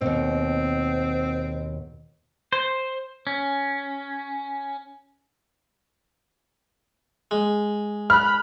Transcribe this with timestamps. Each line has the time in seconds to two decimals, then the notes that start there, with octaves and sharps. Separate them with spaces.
0.01 D#2 B2 C4
2.53 C5
3.27 C#4
7.31 G#3
8.10 B5 F6 F#6